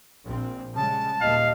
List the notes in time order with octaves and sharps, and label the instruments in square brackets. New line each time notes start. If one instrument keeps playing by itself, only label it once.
[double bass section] A#1 C4
[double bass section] C#3 G3 G#3 [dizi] A5
[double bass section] D#2 A#2 [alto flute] D#5 [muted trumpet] F5